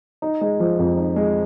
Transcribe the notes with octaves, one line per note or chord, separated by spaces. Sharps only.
D#4
G#3
F3
F2
D#4
G#3